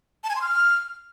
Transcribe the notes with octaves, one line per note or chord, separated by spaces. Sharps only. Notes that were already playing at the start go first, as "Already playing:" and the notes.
A5
G#5
C6
F6